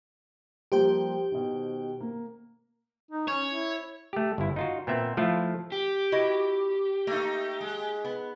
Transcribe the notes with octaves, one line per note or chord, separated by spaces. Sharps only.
F3 G3 A#3 G4 C5 G5
B2 D#3
A#3
D#4
C#4 C#5
E4
A3 G4
G1 E4
D#4 F4 F#4
A#2 B3 C4 E5
F3 A3 E4 F4
G4
E4 F#4 D#5
A3 A#3 D#4
G#3
B3